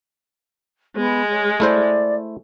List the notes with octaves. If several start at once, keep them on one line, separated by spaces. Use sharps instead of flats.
G#3 B3
C#5
A3 E4 C5 D5